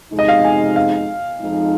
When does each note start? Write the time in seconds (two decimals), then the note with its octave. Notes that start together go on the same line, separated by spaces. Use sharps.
0.12 F2 C3 G#3 D#4
0.19 D#5
0.28 F5
0.44 G#5
0.76 F5
1.40 F2 F3 G#3 D#4